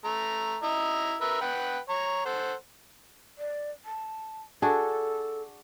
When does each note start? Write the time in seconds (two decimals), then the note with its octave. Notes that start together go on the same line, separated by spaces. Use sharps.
0.05 A3 A#5
0.63 E4 D#5 A#5
1.21 A#4 B4 E5
1.41 B4 F#5 G5
1.89 C#5 A#5
2.26 A4 C5 F#5
3.38 D5
3.85 A5
4.62 D4 F#4 G#4 A4